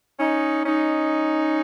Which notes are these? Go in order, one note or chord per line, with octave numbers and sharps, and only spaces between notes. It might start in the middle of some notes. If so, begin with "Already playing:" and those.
C#4 D#4
C#4 D#4